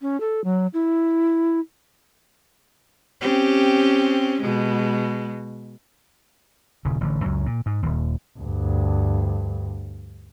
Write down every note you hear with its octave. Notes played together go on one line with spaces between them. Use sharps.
C#4
A4
F#3
E4
C4 C#4 G4
B2 G#3
D#1 C#3
A1 D3
C#2 F#2 F#3
A#2
G#2
D#1 D#2
D2 G2